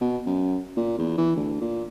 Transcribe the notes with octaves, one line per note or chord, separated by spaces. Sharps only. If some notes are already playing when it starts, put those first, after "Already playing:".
B2
F#2
A#2
E2
E3
D2
A#2